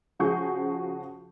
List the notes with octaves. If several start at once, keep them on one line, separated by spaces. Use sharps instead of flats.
C#3 F3 F#4 G#4 C#6 G6